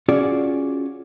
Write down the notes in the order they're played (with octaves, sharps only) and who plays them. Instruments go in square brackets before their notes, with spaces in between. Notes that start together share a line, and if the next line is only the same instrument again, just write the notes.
[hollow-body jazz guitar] C#4 F4 F#4 G#4 D5